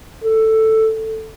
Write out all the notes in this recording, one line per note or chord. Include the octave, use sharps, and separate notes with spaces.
A4